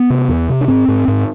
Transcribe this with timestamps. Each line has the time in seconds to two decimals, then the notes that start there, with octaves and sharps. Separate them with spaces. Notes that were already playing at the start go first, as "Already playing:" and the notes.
Already playing: B3
0.10 C3
0.29 E2
0.49 C3
0.61 D4
0.68 G#2 C4
0.88 G#2
1.08 G#2